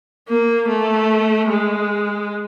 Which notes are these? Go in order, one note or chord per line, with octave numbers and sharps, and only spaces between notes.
A#3
A3
G#3